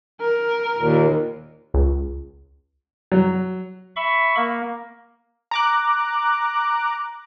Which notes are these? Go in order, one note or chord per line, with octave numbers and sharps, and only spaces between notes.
A#4
D#2 A#2
C#2
F#3
E5 B5 C#6
A#3
A#5 D6 F#6